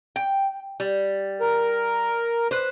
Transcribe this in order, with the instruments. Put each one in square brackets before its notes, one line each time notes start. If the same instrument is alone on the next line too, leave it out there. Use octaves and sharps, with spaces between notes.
[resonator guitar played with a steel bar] G5
G3
[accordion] A#4
[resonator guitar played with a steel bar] B4 C5